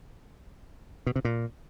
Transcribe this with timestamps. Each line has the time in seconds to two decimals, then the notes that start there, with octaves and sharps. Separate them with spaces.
1.07 B2
1.16 C3
1.25 A#2